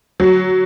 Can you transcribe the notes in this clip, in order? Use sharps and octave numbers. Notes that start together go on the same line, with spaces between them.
F#3